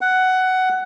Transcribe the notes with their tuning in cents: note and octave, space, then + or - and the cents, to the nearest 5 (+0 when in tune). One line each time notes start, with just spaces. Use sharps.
F#5 +10